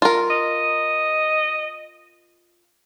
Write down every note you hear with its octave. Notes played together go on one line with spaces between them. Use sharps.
F4 A#4
D#5